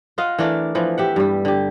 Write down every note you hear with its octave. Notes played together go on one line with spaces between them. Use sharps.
F4 D#5 F5 F#5
E3 A3 D4 A#4
E3 F3 B3
G4 E5 F#5
G2 G3
D3 G4